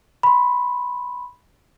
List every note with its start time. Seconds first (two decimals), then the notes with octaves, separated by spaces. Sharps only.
0.23 B5 C6